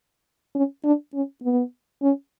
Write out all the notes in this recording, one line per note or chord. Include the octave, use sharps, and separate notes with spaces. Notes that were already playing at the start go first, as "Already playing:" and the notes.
C#4
D4
C#4
B3
C#4